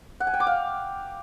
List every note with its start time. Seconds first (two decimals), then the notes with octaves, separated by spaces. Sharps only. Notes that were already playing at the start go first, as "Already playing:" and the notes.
0.20 F#5
0.27 G#5
0.34 G5
0.40 D6
0.47 F5